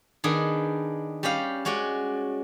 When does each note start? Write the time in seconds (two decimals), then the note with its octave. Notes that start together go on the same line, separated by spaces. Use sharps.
0.24 D#3 B3 D4 G#4
1.23 G3 C#4 G4 F5
1.65 G#3 C#4 F#4 D5